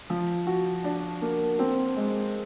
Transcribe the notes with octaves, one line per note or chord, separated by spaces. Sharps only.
F3
F#4
D4
A#3
C4
G#3